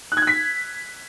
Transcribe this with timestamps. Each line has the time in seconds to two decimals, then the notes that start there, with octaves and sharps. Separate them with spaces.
0.12 F#6
0.17 G#6
0.22 F#6
0.27 B6